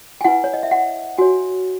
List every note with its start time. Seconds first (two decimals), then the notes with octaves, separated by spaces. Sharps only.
0.21 G#5
0.24 E4 B4 F#5
0.44 C#5
0.53 D#5
0.63 E5
0.71 F#5
1.18 F#4 C#5 G#5